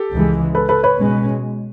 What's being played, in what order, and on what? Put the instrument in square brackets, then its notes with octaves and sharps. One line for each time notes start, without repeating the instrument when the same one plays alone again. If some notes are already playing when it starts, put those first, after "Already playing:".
Already playing: [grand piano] G4 A4
[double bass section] C#2 C#3 E3 G#3
[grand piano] A4 B4
A4 B4
B4 C#5
[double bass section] B2 G#3 C#4